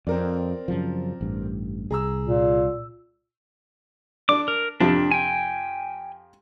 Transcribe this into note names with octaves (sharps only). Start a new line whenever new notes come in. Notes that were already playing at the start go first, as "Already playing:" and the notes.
F2 C4 A#4 D5
F#2 C#3 F3
A1 G2
C2 G#4 A#5 E6
A#2
D4 D6
A#4
F2 C3 F3 D4
G5 G#5